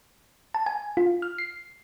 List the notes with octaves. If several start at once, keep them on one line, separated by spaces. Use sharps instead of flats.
A5
G#5
F4
F6
C7